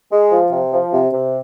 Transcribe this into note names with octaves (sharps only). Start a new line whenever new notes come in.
G#3
F3
C3
F3
C3
C3